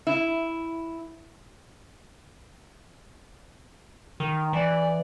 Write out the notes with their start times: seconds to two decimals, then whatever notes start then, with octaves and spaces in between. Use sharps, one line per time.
0.07 E4
4.20 D#3
4.53 E3 D5